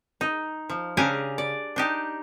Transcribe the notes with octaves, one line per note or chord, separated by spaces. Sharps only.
D#4
F3
C#3 C#4 D4 G4 G#5 A#5
D5
D4 D#4 G4